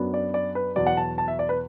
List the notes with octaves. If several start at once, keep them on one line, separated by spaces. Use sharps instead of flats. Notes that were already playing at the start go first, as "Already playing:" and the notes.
Already playing: F#2 F#3 B3 D4
D5
D5
B4
E2 B2 F#3 D5
F#5
A5
A5
E5
D5
B4